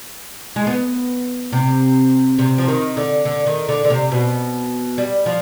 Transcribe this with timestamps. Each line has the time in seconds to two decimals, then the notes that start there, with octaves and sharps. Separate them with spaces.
0.56 G#3
0.67 B3
1.52 C3
2.38 C3
2.58 F3
2.68 D#3
2.97 D3
3.25 D3
3.46 D#3
3.69 D3
3.84 D3
3.90 C3
4.11 B2
4.98 G3
5.26 F3